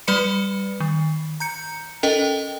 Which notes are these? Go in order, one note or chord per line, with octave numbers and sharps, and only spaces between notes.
G3 B4 D5 B5 C#7
D#3
A#5 G6 C#7
C#4 A4 A#4 D#5 G5